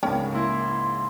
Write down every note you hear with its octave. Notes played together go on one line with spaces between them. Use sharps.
C#2 G#2 C#4 A#4 G5
A#3 E4 C6